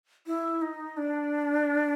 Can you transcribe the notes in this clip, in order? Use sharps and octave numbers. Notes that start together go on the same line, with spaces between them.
E4
D#4
D4